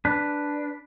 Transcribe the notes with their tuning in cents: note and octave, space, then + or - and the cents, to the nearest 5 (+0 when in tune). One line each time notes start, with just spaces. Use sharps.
D4 +0 B4 +0